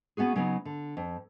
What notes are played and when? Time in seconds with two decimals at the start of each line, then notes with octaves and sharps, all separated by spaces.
0.17 B3 C#4 F#4 G#4
0.36 C#3 F#3 B3 D#4
0.65 D3
0.97 F2